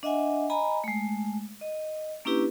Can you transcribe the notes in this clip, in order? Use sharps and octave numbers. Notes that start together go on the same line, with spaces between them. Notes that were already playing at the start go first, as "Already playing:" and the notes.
D4 D#5 E5 F#5 G#5
D#5 G#5 A#5 B5
G#3 A3
D#5
A#3 C#4 D4 E4 G4 B4